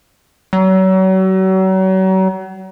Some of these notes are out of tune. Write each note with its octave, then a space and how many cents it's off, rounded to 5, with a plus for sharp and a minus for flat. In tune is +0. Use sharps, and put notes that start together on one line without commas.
F#3 +35